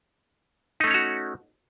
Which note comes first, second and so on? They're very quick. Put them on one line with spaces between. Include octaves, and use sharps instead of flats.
D#4 A3 C#4 C#5 F#4